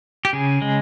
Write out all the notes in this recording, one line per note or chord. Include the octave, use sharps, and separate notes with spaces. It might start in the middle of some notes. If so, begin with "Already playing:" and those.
G4
C#3 G#4
G#3